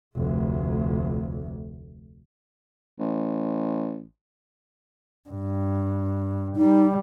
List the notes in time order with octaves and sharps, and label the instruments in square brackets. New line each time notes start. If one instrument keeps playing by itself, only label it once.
[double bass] F1 D2
[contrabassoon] A1
[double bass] G2
[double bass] G3 [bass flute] D#4